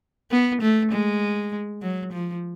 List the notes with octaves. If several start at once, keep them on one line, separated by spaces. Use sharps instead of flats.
B3
A3
G#3
F#3
F3